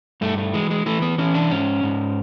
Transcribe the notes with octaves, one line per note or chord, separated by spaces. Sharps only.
G2 A3
A3
E3 G#3
G#3
E3 A3
B3
E3 C#4
D4
G#2 C#4
G#2